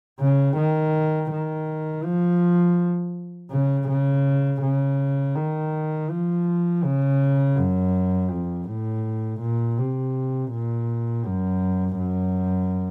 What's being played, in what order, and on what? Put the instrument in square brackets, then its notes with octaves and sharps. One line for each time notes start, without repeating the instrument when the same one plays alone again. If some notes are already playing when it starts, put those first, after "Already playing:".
[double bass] C#3
D#3
D#3
F3
C#3
C#3
C#3
D#3
F3
C#3
F#2
F2
A2
A#2
C3
A#2
F#2
F#2